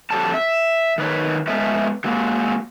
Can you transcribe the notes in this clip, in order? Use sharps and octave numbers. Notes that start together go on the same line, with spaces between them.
F2 D#3 F#3 G3 A4 A5
E5
D#3 B4 C#5
G#3 A3 B3 C#4 E5
F#3 G#3 A#3